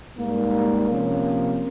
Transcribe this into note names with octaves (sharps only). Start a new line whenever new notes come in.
G#2 G3 A#3
C3 F3 A#3 C#4